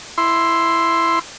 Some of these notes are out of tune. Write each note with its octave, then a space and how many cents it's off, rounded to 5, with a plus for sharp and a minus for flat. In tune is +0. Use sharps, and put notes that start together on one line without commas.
E4 +10 C6 +0